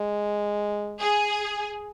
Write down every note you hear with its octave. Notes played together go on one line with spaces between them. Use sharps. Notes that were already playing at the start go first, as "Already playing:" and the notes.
Already playing: G#3
G#4